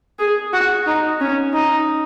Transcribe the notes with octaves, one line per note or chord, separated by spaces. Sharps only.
G#4
F#4
D#4
C#4
D#4